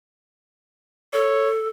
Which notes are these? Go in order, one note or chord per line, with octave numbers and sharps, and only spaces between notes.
A4 C#5